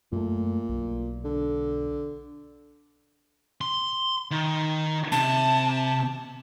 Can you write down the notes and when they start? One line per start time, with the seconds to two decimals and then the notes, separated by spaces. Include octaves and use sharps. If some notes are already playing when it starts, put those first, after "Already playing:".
0.12 F#2 A#2 A3
0.69 B1
1.24 D3
3.61 C6
4.31 D#3
5.12 C3 A5